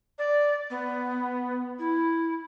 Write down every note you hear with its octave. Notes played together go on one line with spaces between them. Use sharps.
D5
B3
E4